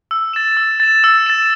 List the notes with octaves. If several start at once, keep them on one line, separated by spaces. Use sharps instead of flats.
E6
A6 E7
E6
A6 E7
E6
A6 E7